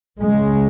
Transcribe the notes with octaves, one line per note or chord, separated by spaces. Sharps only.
C#2 C#3 G#3